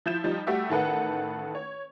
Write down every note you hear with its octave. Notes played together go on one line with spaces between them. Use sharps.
F3 E4 G6 E7
F3 G3 D#4
G3 A3 F#4 G4 E5
A1 D#3 A4 B4 F#5
C#5